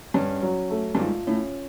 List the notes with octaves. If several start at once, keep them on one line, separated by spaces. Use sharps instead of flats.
G2 C#4
F#3
A3
G2
G#2 F4
A2 C#4